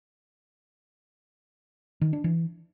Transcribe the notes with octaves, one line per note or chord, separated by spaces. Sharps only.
D#3
D4
E3